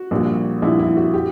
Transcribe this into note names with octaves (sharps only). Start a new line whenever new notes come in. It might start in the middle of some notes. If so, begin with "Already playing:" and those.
Already playing: F#4
A#1 A#2 G3
A#1 A#2 G3 E4
E4
F#4
G4